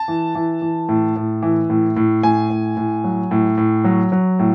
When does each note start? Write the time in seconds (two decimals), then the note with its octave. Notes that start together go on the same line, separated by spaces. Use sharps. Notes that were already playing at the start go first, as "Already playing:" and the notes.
Already playing: A5
0.08 E3
0.35 E3
0.62 E3
0.89 A2
1.16 A2
1.42 E3
1.70 A2
1.96 A2
2.23 A2 G#5
2.50 A2
2.77 A2
3.04 F#3
3.31 A2
3.58 A2
3.84 F#3
4.12 F#3
4.39 A2